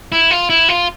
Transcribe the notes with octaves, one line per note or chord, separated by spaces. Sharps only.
E4
F4
E4
F4